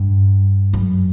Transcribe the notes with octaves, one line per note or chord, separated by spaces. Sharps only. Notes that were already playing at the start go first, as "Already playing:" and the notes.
Already playing: G2
F#2